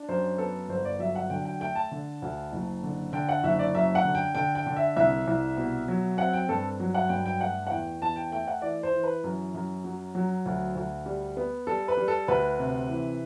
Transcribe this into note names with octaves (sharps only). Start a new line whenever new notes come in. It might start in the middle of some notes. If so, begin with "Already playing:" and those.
Already playing: D4
F#2 C5
B3 A4
G1 C5
D5
F#3 E5
F#5
D3 G5
G5
A3 G5
A5
D3
D2
F#1
D3
D3 G5
F#5
F#1 E5
D5
F#2 E5
F#5
D3
G5
D3 G5
G5
D3
E5
C2 E5
C2
B2
F#3
C4 F#5
G5
G2 A4
F#3
F#5
G2 G5
G5
A3 F#5
F#5
E2 G5
E2 A5
G5
A3 G5
F#5
E3 D5
C5
E3
B4
F#2
F#2
F#3
F#3
D2
D2
G3
B3
G3 A4
B4
G3
A4
D2 B4
C3
E3